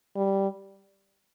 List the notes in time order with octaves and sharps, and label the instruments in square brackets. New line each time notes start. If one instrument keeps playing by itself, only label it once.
[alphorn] G3